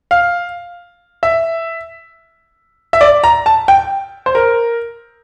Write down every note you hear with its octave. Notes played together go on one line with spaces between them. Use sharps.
F5
E5
E5
D5
A#5
A5
G5
C5
A#4